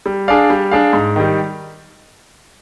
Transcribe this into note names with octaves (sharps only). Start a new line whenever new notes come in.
G3
D4 G#4 D5 F5
G3
D4 G#4 D5 F5
G#2
D#3 G3